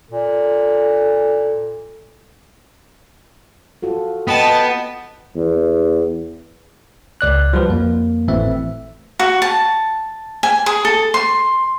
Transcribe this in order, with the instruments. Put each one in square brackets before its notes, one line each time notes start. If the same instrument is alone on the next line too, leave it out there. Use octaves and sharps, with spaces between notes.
[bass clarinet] A#2 [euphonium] A4
[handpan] F4 F#4 A4
[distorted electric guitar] B3 [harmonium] D#5 G5 [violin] A5
[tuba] E2
[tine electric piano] C#2 D5 F#6
F3 G3 F#4 B4
F2 A#3
G#1 A2 E3 A3 C4 E5
[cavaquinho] F#4
A5
G#5
G#4
A4
C6